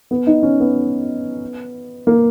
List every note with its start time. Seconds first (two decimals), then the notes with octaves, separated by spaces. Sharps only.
0.11 B3
0.27 D#4
0.43 C#4
0.60 B3
2.07 A#3